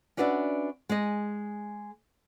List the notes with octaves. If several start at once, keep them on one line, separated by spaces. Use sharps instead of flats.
C#4 D4 F#4 B4 D5 E5
G#3 G#4 D#5